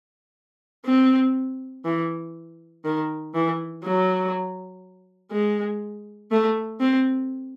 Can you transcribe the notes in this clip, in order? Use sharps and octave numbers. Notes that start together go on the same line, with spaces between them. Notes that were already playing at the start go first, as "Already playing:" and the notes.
C4
E3
D#3
E3
F#3
G#3
A3
C4